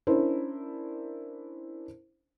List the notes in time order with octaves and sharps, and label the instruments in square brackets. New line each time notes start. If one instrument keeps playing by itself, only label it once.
[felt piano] C#4 D4 E4 A#4 C5